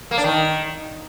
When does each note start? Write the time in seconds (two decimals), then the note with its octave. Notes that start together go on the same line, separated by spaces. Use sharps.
0.11 A#3
0.18 D4
0.24 D#3